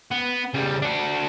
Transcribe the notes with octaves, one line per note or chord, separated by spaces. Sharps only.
B3
C#3 G3
D4 F#4